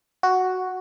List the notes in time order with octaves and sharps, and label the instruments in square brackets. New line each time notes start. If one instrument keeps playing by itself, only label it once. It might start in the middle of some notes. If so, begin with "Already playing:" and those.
[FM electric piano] F#4